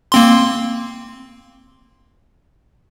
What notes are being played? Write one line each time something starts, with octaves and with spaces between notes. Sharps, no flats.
A#3 C4 C6